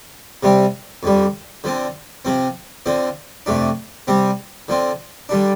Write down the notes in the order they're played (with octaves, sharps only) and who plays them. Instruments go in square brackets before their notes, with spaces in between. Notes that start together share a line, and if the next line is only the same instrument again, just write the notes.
[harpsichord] C3 G3 C4
F2 D3 G3
D3 F3 C4
C3 F3 C4
D3 F3 C4
F2 C3 A3 D4
C3 G3 C4
D3 F3 C4
D3 G3 D4